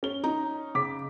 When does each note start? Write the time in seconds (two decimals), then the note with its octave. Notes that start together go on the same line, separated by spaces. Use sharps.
0.03 C#4 G7
0.24 D#4
0.75 C#3 D6 B6